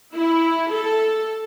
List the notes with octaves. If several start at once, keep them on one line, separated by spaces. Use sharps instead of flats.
E4
A4